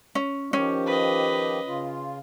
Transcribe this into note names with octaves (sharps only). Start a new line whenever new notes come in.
C#4
D#3 F3 C#4 G4
B4 D#5
C#3 F4